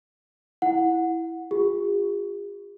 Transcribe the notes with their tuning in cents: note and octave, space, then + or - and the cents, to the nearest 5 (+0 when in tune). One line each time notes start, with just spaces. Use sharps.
E4 +0 F#5 -15
F4 +20 G#4 -45